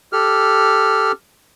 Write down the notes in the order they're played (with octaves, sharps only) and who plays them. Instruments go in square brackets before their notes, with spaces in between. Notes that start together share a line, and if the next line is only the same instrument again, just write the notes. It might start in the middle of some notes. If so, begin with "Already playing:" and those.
[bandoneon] G4 A4 F6